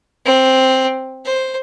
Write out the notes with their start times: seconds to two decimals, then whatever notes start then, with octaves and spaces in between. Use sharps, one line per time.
0.26 C4
1.25 C5